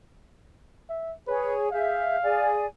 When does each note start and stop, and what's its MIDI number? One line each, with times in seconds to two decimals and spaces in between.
0.89 1.13 76
1.27 1.69 68
1.27 1.55 71
1.27 1.69 73
1.72 2.17 68
1.72 2.17 76
1.72 2.60 77
1.72 2.17 91
2.23 2.66 68
2.23 2.66 74
2.23 2.66 80